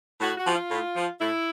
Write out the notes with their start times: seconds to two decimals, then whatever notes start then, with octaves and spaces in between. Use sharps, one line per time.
0.20 A2 F#4
0.37 F#4
0.45 F3
0.53 F4
0.69 A2
0.95 F3
1.19 A2 E4